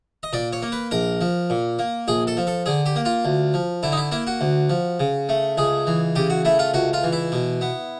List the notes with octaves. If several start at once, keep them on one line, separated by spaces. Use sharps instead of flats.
D#5
A#2 D5
C#5
A#3
B4
A#1 A#4
F3
A#2
A#3
A#1 G#4
A4
F3
A4
D3 G#4
G4
A#3
F4
D2
F3
D3 E4
D#4
E4
A#3 E4
F#4
D2
F3
C#3
A3
C#2 G#4
E3
C#3 G4
F#4
A3 E4
F4
C#2 F#4
F4
E3
E4
B2
B3